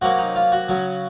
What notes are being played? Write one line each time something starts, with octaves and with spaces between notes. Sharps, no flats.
C3 F#3 A#3 C#4 F#4
D#4
F4
F#4
C#3 F#3 C#4